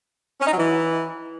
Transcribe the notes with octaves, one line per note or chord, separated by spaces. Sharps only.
C#4
D#4
F#3
E3